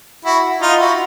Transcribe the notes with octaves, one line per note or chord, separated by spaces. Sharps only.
E4 F#4
D#4 F4
E4 F#4